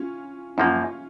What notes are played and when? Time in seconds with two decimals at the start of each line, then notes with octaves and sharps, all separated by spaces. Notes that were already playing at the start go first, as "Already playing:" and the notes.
Already playing: C#4 F4
0.58 F#2 F3 A#3 C#4 F4